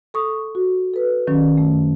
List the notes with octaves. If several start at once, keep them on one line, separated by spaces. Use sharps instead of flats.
A4 C#6 D#6
F#4
A4 B4
D#3 F#3 C#4
F#2 A3